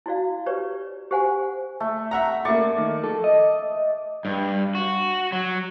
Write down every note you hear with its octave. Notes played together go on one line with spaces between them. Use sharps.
E4 F#4 D5 F5
G4 B4 C#5 D5
G4 C5 F#5 G#5
A3
E5 F#5 A#5
A3 A#3 D5 C#6
D#3
F3 A4
D#5
G2
F#4
F#3